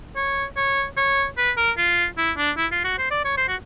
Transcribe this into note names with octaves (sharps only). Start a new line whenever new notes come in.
C#5
C#5
C#5
B4
A#4
F4
E4
D4
E4
F4
F#4
C5
D5
C#5
C5
F#4